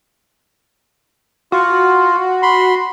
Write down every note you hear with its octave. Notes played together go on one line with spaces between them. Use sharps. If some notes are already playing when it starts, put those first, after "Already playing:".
F4 F#4
B5 C6